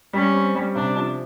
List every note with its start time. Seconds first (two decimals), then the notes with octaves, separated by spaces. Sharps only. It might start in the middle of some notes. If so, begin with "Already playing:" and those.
0.13 G3 C#4
0.34 C4
0.55 G3
0.75 C3 D4
0.96 F3